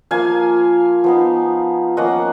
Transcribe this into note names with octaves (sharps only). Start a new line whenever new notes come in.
F3 A#3 F4 F5 G#5
F3 B3 D#4
F3 A#3 C#4 F4 D#5 F#5